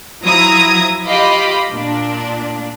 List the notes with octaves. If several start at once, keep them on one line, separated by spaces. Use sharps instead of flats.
F3 F#3 E4 A#5 D#6 G#6
F4 G4 D#5 F5 B5 D6
A#2 D4